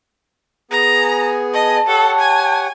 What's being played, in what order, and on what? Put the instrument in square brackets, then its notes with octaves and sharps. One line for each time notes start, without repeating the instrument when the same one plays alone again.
[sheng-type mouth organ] B3 G#4 G#5 [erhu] A#5
[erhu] D#5 [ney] A5
[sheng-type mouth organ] G4 C#5 F#5 [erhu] A4
[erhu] G#5